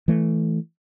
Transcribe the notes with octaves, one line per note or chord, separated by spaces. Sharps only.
E3 A3